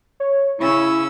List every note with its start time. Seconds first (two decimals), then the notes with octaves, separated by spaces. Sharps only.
0.20 C#5
0.60 C#3 C#4 E4 C#6 E6